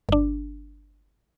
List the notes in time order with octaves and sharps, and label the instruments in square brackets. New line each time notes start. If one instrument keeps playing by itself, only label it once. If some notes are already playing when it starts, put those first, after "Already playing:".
[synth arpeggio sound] G1 D4